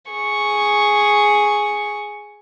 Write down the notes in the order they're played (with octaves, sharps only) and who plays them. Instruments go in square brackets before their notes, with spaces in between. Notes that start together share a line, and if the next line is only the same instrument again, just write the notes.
[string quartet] G#4 C#6